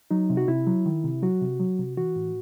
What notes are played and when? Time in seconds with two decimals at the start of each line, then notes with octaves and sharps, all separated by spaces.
0.11 F#3 D#4
0.30 C3
0.37 F#4
0.48 C3 E4
0.67 F#3
0.86 D#3
1.04 C3
1.23 F#3 F#4
1.41 C3
1.60 F#3
1.79 C3
1.97 E3 F#4
2.16 A2